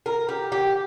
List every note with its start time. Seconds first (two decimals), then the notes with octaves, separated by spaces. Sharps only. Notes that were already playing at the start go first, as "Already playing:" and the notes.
0.06 A#4
0.29 G4
0.52 G4